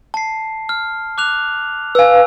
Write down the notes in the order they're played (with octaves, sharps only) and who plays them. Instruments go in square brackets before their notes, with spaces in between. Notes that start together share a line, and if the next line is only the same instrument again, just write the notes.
[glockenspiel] A5 C7
F6
D6 F#6 F7
[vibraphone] B4 F5 [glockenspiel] G#5 E6